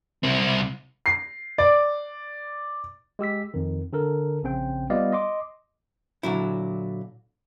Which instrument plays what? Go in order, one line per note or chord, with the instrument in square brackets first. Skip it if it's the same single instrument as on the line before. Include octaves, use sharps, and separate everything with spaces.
[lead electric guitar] C2 C4
[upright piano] C7
D5
[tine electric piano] G#3 G4 E6 B6
F2 D#3
D3 A4 A#4
A#1 C#3 C4 G5
G3 B3 F4 D5 D#5 F5
D#5 C6 D6
[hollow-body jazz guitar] A#2 D3 F#3 E4